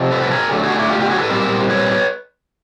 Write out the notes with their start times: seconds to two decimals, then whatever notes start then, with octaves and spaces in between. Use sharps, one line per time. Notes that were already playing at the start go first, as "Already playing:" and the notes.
Already playing: C3 F3 A3
0.11 A4 B4
0.22 B4
0.31 G#4 A#4
0.51 D3 F#3 A3
0.63 F#4 G#4
0.77 D4 E4
0.90 F4 G4
1.00 F4 G4
1.10 F#4 G#4
1.19 A4 B4
1.30 A#2 G3 C4 A#4 C5
1.69 B4 C#5